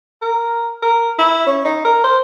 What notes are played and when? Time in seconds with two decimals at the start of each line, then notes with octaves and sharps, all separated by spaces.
0.22 A#4
0.83 A#4
1.19 E4
1.47 C#4
1.65 D#4
1.85 A#4
2.04 C5